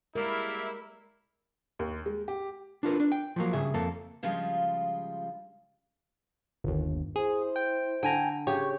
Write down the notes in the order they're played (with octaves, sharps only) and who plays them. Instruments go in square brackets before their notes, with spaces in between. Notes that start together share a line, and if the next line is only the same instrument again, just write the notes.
[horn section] G3 A#3 E4 [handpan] G#3 A#4
[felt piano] D#2
G#3
G4
[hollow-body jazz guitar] D4 F4 A#4 B4
D4
G5
F3 F#3 A#3
G2 C#3 G#4 E5
F2 A#3 A4
[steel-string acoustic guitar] C#3 F3 G3 G#3 F4
[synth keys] G1 D#2
[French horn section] E4 C5 [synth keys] G#4
[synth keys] G5
[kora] D3 [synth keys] G5 G#5 A#5
[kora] C#3 G4 [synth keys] C#5